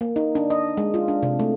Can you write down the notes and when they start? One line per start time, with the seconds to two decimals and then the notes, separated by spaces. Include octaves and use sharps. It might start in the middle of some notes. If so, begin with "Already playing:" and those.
0.01 A#3
0.16 D#4
0.35 D4
0.50 D#5
0.77 G#3
0.94 F4
1.08 D4
1.23 C3
1.39 A3